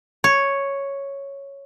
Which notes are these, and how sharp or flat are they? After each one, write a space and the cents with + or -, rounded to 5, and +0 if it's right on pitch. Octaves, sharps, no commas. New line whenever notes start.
C#5 +0